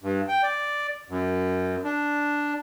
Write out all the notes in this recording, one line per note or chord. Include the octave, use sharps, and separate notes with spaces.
G2
G5
D5
F#2
D4